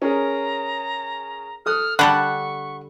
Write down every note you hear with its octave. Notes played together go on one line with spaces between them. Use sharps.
C#4 G#4 A#4 A#5
A4 D#6 F6 F#6
D3 G3 A4 F#5 B5 C#6